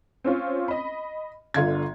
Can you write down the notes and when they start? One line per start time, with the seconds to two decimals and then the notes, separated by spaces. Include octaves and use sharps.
0.24 C4 C#4 F4
0.68 D#5 B5
1.54 G1 D3 F4 G#6